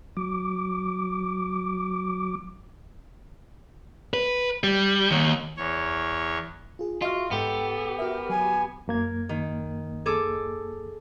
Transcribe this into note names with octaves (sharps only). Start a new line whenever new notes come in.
F#3 D6
B4
G3
D#2
E2 C#5
F4 G#4
F4 F#4 D#5 E5 F6
G#2 B3 G4 A4
F#4 A#4 E5
F#3 G#5 B5
F#2 A#3 G#6
D#3
G#4 A4 D6